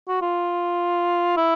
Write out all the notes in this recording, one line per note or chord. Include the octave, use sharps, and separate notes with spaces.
F#4
F4
E4